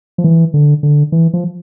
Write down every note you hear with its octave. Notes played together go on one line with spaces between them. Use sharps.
F3
E3
D3
D3
E3
F3